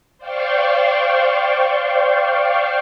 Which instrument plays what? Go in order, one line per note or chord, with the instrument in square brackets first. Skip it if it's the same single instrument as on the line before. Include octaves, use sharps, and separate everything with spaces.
[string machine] C5 D5 F5 G5 C6 C#6